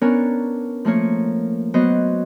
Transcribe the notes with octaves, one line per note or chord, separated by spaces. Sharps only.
B3 C#4 D4 A#4 C#5
F3 A3 A#3 C#5
F#3 B3 C5 D#5